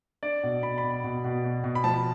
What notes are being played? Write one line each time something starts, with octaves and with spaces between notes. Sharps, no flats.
D4 D5
B2
B2 B5
B5
B2
B2
B2
B2
B2
B5
F3 A5